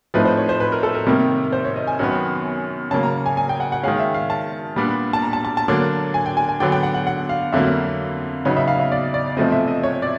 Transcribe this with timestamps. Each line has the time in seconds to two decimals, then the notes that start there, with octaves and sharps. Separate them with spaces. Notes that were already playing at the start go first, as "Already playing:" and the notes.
0.14 A2 F3 A3 C4 D#4 B4
0.25 C5
0.37 C#5
0.49 C5
0.60 B4
0.72 A#4
0.83 A4
0.94 A#4
1.07 C3 D#3 G3 A#3
1.52 C5
1.65 C#5
1.76 D#5
1.87 G#5
1.99 F#2 D#3 F#3 B3
2.91 C#3 F#3 A#3 C#4 A5
3.03 A#5
3.26 G#5
3.37 G#5
3.49 G5
3.60 F#5
3.72 F#5
3.83 D#3 G#3 C#4 F5
3.99 E5
4.14 F5
4.30 A5
4.76 A#2 G3 B3 D4
5.13 A5
5.22 A#5
5.33 A5
5.45 A5
5.57 A5
5.68 D3 F#3 A#3 D4
6.14 G#5
6.26 G5
6.37 G#5
6.49 G#5
6.60 D3 F#3 B3 D4 G5
6.72 G5
6.83 F#5
6.94 F#5
7.07 F#5
7.29 F5
7.53 F2 D3 F#3 A#3 E5
8.45 E2 C#3 F#3 B3 D#4
8.57 E5
8.68 F5
8.80 E5
8.92 D5
9.14 D5
9.37 E2 C3 F3 A3 C4 D#5
9.52 E5
9.67 D#5
9.84 C#5
10.02 D5